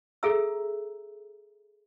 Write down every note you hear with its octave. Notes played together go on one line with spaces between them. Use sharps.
G#4 A4 E5 A#5 E6